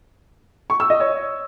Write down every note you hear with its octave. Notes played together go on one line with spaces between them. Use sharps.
C#6
E6
D#5
C#5